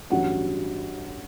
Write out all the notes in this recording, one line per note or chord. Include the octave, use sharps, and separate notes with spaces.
A1 G2 F#3 F#5